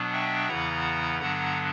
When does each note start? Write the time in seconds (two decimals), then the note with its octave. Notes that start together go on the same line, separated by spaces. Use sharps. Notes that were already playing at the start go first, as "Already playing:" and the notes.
Already playing: B2 F#3 B3 D4
0.13 E5 G5
0.48 E2 C#3 E3 B3 E4 F#5 A#5
1.20 G2 D3 F#3 B3 D4 F#5 A#5